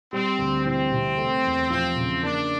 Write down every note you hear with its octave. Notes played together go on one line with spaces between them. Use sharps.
G3 C4
D2
E3 C4
C3
A3
E2
F3 C4
C#3
A#3 D4